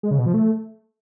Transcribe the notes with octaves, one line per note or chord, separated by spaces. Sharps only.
G#3
C#3
B2
F3
A3